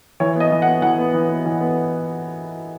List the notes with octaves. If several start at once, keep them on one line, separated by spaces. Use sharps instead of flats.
E3 C#5
B3 D#5
E3
F#5
B3
E3 F#5
B3
E3
B3
E3
B3